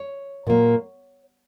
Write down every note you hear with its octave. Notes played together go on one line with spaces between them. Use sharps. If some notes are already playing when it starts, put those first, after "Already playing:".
Already playing: C#5
A#2 F#3 A#3